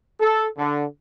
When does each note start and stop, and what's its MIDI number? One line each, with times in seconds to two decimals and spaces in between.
0.19 0.47 69
0.57 0.84 50